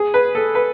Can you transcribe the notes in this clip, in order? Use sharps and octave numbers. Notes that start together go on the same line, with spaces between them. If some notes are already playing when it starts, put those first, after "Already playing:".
Already playing: G#4
B4
A4
B4